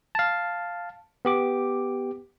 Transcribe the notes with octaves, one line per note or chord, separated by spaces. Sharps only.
F5 A5
B3 G4 D6